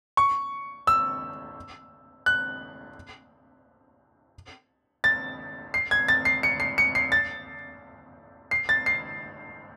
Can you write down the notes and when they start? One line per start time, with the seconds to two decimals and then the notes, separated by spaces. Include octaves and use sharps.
0.17 C#6
0.87 E6
2.26 F#6
5.04 A6
5.74 C7
5.91 G#6
6.08 A6
6.25 C7
6.43 C#7
6.60 C7
6.78 C#7
6.95 C7
7.12 A6
8.51 C7
8.69 A6
8.86 C7